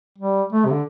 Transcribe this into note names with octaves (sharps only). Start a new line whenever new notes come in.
G3
A3
C3
D3